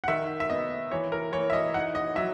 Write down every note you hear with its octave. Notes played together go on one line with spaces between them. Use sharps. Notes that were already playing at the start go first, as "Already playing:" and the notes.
F#5
D#3 E5
E5
B3 D#5
E3 C#5
A#4
E3 C#5
E5
D#5
D#4 F#5
D#5
F#3 E5